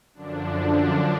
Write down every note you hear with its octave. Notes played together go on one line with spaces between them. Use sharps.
F#2 D3 F3 D4